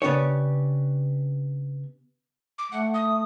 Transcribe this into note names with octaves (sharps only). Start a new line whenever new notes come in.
C#3 B3 D4 G4 C#5
D6
A3 F#5
D#6